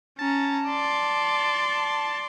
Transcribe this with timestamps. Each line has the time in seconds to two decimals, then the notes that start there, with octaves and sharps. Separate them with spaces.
0.19 C#4 A5 A#5
0.68 D5 C6